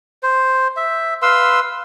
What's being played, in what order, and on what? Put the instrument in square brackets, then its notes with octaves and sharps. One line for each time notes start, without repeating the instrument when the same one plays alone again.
[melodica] C5
E5
B4 F5 C6 E6